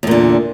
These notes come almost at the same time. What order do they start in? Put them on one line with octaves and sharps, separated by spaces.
E2 A#2 D3